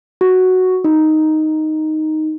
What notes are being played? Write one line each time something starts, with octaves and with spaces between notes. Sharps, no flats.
F#4
D#4